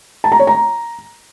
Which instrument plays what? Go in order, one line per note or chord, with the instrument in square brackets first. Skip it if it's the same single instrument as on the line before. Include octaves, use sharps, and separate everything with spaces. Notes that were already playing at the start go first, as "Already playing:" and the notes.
[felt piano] A5
A#5
C#5
A#5